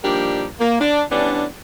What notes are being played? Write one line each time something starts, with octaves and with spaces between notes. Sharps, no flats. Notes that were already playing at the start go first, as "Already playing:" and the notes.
D#2 F3 G3 D4 G4 A#4
A#3
D4
E3 G3 B3 C#4 D4